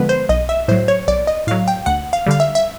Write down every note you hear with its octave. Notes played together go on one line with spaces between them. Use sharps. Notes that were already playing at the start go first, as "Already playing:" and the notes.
Already playing: D3 F3 G#3 B3 B4
C5
B1 D#5
E5
A2 F#3 C5
C#5
B1 D5
D#5
A2 F#3 F5
G5
D2 F#5
F5
D3 G3 F5
E5
E5